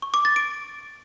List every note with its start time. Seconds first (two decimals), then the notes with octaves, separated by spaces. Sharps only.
0.02 C#6
0.14 D6
0.25 A6
0.36 D7